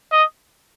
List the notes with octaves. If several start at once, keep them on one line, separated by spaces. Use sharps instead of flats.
D#5